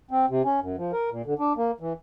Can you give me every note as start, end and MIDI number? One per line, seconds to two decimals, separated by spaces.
0.11 0.26 60
0.30 0.42 48
0.45 0.60 61
0.61 0.76 42
0.77 0.92 53
0.92 1.10 70
1.11 1.22 46
1.26 1.34 50
1.39 1.53 62
1.57 1.71 58
1.80 1.93 52